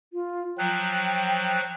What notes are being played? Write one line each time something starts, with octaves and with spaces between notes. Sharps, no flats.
F4
F3 F#3 G5 F#6